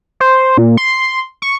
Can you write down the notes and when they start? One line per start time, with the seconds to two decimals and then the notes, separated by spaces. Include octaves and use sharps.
0.20 C5
0.58 A#2
0.77 C6
1.42 C#6